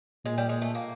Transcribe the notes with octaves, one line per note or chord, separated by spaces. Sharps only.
A#2 G#3
G3
G#3
A3
A#3